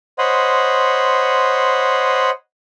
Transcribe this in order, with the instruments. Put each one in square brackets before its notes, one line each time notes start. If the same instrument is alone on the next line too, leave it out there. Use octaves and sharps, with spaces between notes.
[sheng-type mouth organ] C5 C#5 D#5 F#5 B5 C6